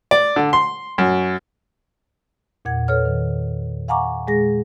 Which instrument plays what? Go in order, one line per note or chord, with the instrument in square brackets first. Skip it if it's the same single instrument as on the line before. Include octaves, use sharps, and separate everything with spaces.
[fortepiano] D5
D3
C6
F#2
[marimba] E2 A#2 F#5 G#6
A4 B4 C#5 F6
D#3
F5 F#5 G#5 A#5 C#6 D6
A#2 G#3 G#4 A#6